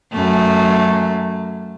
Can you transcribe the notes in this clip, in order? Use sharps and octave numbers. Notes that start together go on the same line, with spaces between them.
F#2 A3